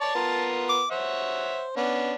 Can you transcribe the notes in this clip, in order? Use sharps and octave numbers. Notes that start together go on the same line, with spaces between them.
C#5 D5 A5 C#6
B3 F4 A#4
D6
C5 C#5 E5 F#5
B3 C#4 D4